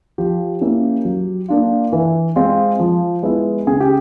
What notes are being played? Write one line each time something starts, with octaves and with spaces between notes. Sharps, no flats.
F3 G4
A#3 C#4 E4
F#3
A#3 D4 F4
E3
G#3 C4 F4
F3
G#3 B3 E4
C#3 G#4
G4